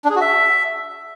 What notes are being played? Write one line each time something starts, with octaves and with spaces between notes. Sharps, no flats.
D4
G#4
F#4
E5